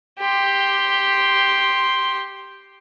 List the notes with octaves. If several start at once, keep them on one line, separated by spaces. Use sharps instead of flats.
G4 C6